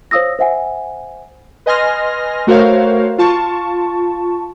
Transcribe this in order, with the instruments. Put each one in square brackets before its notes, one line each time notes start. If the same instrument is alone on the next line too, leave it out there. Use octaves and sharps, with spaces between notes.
[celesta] C5 C#5 F5 D#6 E6 A#6
C5 E5 F#5 G#5
[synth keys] B4 D#5 G#5 C6 F6 A#6
A3 F#4 A#4 C5 C#5 F5
F4 A5 C#6